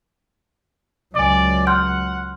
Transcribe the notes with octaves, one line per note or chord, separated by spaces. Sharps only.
C#2 F#3 D5 G#5 D6
F#5 C6 F6 G6